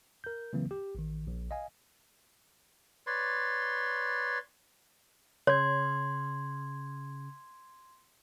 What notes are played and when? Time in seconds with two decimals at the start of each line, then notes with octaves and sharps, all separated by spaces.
0.24 A#4 G6
0.53 C#3 E3 F#3 A#3 C4
0.71 G4
0.95 A1 D#3
1.27 A#1
1.51 D#5 F5 G#5
3.07 B4 C#5 D5 C6
5.47 C#3 C#5 C6 G#6